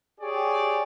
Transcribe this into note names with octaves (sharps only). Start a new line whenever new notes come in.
G4 G#4 C#5 D5